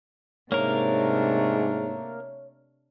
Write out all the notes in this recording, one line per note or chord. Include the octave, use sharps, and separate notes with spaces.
G#2 C3 A3 A#3 D4 A#4 C#5